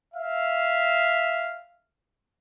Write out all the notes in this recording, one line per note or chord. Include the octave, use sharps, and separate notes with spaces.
E5 F5